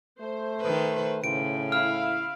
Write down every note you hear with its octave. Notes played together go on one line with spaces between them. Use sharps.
A3 C5
D#3 B4
A2 C#3 D7
E4 F5 F6